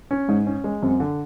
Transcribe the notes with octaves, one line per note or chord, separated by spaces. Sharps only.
C#4
G#2 G#3
C#4
G#3
F#2 C4
D3